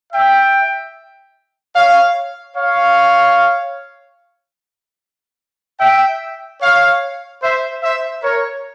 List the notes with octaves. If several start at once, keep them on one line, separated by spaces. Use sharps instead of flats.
E5 G5
C#5 F5
C#5 F5
E5 G5
C#5 F5
C5 E5
C5 E5
A#4 C#5